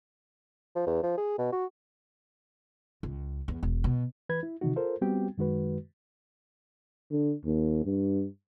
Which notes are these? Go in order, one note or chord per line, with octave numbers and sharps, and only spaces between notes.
F3
E2
F3
G#4
B2
F#4
C#2
E2
E1
B2
E3 B4 B5 G#6
E4
C3 D#3 E3 D#4 F#4
F4 A4 A#4 C5
G3 B3 C4 F#4 G4 G5
F#2 D#3 G#3 F#4 B4
D3
D#2
G2